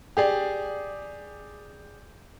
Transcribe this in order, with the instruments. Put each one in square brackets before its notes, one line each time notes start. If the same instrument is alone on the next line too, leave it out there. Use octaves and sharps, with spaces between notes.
[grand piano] G4 G#4 D5